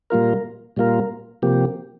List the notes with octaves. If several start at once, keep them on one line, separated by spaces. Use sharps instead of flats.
A#2 G3 A#3 F4 A#4
A#2 G3 A#3 F4 A#4
C3 F3 A#3 G4